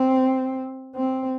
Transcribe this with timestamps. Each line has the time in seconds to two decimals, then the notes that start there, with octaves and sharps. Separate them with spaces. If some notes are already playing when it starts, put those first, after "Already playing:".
Already playing: C4
0.95 C4